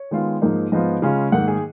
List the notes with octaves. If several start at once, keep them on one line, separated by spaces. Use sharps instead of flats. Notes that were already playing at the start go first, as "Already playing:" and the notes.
Already playing: C#5
D#3 G#3 B3 F4
G#2 F3 A#3 D#4
G#2 F3 B3 F4 D#5
C#3 G#3 C#4 F4 F5
G#2 D#3 A#3 F#5
G#4